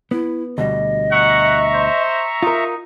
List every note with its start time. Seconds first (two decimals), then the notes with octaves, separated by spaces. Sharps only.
0.11 B3 E4
0.58 D2 B2 G3 D#5
1.12 E5 F#5 A#5 C#6
1.74 C5
2.43 D#4 F4 A#4